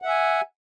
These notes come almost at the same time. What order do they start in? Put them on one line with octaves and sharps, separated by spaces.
F#5 E5 G#5